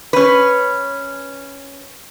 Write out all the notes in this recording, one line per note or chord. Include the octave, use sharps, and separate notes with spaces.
C#4 B4